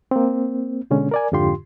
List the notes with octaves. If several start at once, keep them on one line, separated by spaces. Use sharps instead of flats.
A#3 C4
B2 D3 G#3 C#4
A#4 D5 G#5
F2 G#2 D3 F4 G4 C6